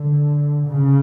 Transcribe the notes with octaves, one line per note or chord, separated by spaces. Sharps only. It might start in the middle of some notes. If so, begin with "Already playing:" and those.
Already playing: D3
C#3